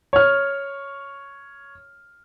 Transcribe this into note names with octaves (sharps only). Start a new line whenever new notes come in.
C#5 F6